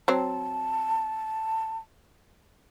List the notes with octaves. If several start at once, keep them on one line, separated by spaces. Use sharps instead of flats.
F#3 C4 A5